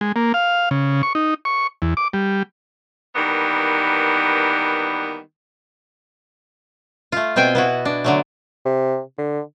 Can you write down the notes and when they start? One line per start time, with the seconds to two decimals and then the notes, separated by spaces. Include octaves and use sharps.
0.01 G#3
0.16 A#3
0.34 F5
0.71 C#3
1.03 C#6
1.15 D#4
1.45 C#6
1.82 E2
1.97 D6
2.13 G3
3.16 D#3 E3 G3 A#3 B3
7.12 A3 F4
7.36 B2 C4 C5 G5 G#5
7.55 B3 E4 F#4
7.85 D4
8.04 D3 F#3 A3
8.66 C3
9.18 D3